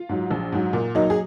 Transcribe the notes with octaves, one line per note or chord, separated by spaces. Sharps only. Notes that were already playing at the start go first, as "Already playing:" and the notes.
Already playing: F4
G#2 F#3
A#1
G#2 F#3
A#2
F#3 A#3 D#4
G#4